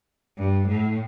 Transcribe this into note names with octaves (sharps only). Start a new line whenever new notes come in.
G2
A2